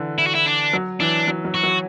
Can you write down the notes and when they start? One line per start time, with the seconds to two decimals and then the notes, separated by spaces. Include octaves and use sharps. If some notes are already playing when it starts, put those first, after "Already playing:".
Already playing: D3 E3
0.19 E4
0.27 F#4
0.35 E4
0.46 D4
0.73 F#3
1.00 E3 D4
1.28 F#3
1.45 F#3
1.54 F#4
1.63 F#3